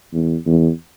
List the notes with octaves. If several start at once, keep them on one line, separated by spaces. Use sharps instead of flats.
E2
E2